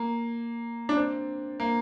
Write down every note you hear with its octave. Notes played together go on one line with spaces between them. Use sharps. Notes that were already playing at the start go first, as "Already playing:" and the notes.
Already playing: A#3
D4
C4
A#3